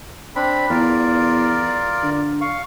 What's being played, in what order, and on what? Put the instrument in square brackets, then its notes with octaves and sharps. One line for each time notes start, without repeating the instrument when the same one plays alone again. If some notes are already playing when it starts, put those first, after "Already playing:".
[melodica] C4 D4 B5
[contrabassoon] E2 [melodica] F4 A#4 D5
[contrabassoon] D3
[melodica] F5 C#6